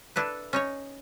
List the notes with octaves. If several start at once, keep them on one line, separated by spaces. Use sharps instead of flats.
D4 E4 A4 B4
C#4 D#4 C#5